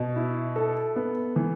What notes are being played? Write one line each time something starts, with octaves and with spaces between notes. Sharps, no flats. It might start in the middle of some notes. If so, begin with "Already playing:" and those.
Already playing: B2
E4
A4
B3
E3